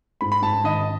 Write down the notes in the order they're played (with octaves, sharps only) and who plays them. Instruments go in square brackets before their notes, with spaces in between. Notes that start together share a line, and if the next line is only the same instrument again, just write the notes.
[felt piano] G#2 [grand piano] B5
[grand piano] B5
[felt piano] G#2 [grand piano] A5
[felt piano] D#3 [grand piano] D#5